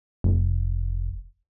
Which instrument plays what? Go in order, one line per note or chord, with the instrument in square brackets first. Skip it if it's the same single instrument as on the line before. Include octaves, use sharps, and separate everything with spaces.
[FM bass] F1